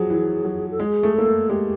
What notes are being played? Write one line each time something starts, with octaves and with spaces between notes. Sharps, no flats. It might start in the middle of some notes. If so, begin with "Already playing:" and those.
Already playing: F3 F#3 G#4
E3
F#3
A4
G#3 G#4
A3
A#3 A4
A3
G#3 G4